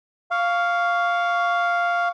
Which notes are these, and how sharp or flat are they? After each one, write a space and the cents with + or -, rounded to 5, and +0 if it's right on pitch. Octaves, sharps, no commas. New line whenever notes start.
F5 +0 C#6 +20